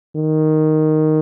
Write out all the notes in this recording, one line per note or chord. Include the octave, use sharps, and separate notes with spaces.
D#3